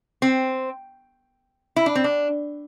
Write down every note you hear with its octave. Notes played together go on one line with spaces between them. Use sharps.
C4
E4
D4
C4
D4